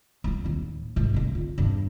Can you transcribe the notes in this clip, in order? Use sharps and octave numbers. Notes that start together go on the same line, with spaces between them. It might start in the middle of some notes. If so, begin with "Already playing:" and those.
G3 A#3
D#2 A2
G#2 A3
D3 G3
F4
E2 G2